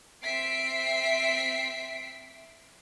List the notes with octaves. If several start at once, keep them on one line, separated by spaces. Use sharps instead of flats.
C4 E5 B6 C7 D7